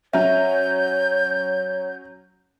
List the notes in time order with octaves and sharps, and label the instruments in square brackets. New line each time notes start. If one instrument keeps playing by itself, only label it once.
[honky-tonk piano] F#3 C#4 [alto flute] C#5 [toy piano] E5 [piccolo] G6